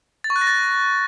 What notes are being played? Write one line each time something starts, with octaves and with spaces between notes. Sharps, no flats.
A6
C#6
F#6
A#6
A6